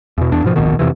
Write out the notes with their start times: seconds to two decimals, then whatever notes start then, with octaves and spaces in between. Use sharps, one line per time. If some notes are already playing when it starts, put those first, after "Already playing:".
0.18 E2 B2
0.32 E2 D4
0.44 G#2 B2 F3
0.56 D1 A#1 B2 D#3
0.79 F2 G#2 C3 E3